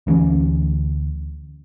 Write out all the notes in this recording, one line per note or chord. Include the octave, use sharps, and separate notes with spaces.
D2 E3 B3 C#4